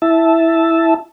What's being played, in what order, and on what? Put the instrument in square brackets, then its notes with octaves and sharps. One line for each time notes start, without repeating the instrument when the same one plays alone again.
[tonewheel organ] E4 E5 A5